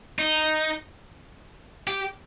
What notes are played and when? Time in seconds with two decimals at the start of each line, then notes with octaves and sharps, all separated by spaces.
0.19 D#4
1.87 G4